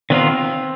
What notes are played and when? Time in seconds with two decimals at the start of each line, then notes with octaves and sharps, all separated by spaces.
0.10 D#3 B3 C4 F4